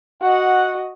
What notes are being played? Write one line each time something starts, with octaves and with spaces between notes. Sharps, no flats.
F#4 D#5 F#5